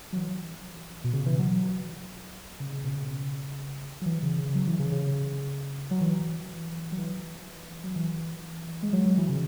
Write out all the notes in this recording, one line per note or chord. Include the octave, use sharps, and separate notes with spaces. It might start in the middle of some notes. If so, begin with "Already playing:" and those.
F#3
E3
B2
C#3
E3
F#3
F#3
C#3
C#3
B2
C#3
F#3
E3
C#3
C#3
F#3
E3
C#3
C#3
C#3
F#3
E3
F#3
E3
F#3
E3
G#3
F#3
F#3
E3
C#3